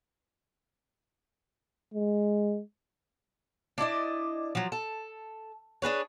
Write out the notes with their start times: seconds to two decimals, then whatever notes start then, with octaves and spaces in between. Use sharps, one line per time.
1.94 G#3
3.78 D4 E4 D5 D#5
4.55 F3 F#3
4.72 A4
5.82 D4 G#4 B4 C#5